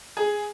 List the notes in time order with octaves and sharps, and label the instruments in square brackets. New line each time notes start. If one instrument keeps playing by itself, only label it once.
[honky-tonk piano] G#4